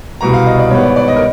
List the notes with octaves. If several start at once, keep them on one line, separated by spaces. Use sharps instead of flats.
C2 B2 G3 A#5
F5
D#5
D5
G#2 D#3 G3 B3 C#5
D5
D5
D#5
A#4